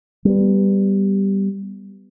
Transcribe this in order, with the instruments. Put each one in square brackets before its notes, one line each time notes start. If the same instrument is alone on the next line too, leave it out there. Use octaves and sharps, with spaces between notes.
[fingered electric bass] G3 B3